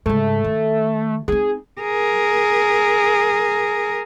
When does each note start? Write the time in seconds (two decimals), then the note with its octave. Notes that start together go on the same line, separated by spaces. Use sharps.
0.06 G#2 C#3 A3
0.44 D#3
1.28 C4 D#4 G#4
1.81 G#4 A#4